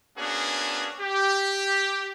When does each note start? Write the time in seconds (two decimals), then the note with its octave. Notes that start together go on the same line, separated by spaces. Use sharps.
0.18 A#3 B3 C#4 D4 F#4 G#4
1.00 G4